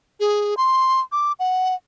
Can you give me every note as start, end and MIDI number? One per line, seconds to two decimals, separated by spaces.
0.20 0.55 68
0.57 1.01 84
1.12 1.32 86
1.39 1.75 78